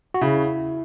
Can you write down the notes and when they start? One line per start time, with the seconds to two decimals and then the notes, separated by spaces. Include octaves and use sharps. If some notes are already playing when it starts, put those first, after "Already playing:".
0.14 F#4
0.21 C#3 E4